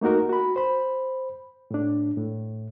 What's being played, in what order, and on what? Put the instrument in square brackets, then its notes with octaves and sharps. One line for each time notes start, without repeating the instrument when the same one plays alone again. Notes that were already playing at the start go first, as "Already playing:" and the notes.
[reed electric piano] A3 A#3 D#4 F#4 A#4
F#4 B5
C5 B5
A2 D4
A2